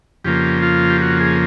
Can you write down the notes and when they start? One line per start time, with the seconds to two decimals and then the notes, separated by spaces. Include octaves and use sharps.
0.24 F2 C#3 F3 A#3 G4
0.63 F4
0.90 G4
1.01 F#4
1.20 G#4